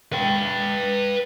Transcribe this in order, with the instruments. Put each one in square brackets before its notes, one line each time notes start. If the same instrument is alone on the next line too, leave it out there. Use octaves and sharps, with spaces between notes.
[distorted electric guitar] B4 G5